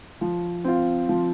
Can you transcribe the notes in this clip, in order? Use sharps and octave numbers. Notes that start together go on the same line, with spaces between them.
F3
C4 F4
F3